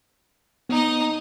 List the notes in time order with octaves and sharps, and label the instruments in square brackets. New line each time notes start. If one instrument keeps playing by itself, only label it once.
[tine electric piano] B3 [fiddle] D#4 D#5